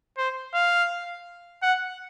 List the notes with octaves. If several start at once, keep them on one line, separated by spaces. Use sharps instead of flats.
C5
F5
F#5